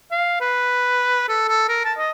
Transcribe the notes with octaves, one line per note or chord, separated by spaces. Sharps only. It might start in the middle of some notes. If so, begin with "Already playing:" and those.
F5
B4
A4
A4
A#4
A5
D#5